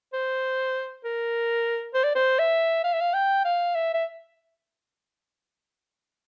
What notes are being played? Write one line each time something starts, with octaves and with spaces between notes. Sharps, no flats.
C5
A#4
C5
D5
C5
E5
F5
E5
F5
G5
F5
E5
E5